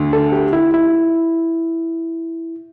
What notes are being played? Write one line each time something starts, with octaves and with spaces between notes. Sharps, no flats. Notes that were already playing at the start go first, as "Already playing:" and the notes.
Already playing: D2 D3
A4
G4
E4
E4